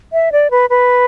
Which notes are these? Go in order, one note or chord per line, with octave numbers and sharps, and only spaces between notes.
E5
D5
B4
B4